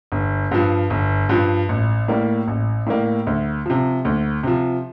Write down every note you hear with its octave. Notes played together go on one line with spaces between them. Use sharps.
G1
G2 F3
G1
G2 F3
A1
A2 G3 A#3
A1
A2 G3 A#3
D2
C3 F3
D2
C3 F3